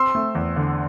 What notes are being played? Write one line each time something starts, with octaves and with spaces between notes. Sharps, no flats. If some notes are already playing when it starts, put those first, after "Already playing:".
Already playing: C4 C6 E6
A3
E2
D3